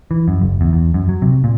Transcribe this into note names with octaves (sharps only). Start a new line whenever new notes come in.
E3
F#2
F#1
E2
E2
F#2
F#3
C3
A#2